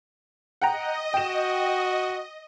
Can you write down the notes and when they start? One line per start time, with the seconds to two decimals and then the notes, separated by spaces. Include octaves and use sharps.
0.62 D#5 F#5 G5 A#5
1.14 F#4 G5 E7